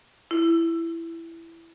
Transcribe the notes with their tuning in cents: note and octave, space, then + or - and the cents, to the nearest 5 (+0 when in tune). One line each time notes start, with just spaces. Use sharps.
E4 +10